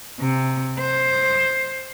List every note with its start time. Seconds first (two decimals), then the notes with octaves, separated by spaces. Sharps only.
0.20 C3
0.79 C5